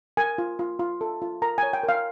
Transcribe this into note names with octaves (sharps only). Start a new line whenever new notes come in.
A#4 G#5
F4
F4
F4
A4
F4
A#4 A#5
G#5
C#5
G5
A#4
F5